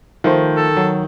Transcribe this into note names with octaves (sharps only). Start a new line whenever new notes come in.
D#3 F3 A3 C5
A4
F#3